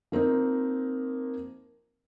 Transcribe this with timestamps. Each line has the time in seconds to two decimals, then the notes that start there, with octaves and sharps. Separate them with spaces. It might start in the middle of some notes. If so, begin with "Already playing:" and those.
0.12 F3 A#3 C4 D#4